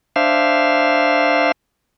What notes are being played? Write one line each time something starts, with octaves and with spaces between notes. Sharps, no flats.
D4 C5 E5 F5